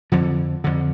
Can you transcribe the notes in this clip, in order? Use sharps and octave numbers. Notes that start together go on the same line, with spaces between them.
F2 D3 F3
F2 D3